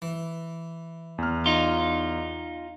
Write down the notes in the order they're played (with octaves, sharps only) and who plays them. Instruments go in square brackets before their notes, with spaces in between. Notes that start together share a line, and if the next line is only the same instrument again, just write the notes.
[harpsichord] E3
[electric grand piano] E2 F6
[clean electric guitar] D#4 F4